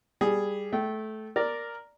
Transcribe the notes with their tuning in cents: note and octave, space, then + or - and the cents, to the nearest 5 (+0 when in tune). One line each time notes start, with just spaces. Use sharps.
G3 +10 G#4 +0
A3 -20 G5 -25
A#4 +0 D5 +0